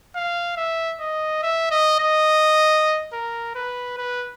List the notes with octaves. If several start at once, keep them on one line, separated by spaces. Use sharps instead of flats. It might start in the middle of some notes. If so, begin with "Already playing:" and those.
F5
E5
D#5
E5
D#5
D#5
A#4
B4
B4